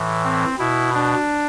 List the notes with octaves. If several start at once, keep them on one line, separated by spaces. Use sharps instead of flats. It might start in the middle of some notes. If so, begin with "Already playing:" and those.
Already playing: A2 E3
C4
B2 E4
D4